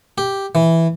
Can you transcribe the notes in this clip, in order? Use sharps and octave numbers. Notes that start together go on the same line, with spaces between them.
G4
E3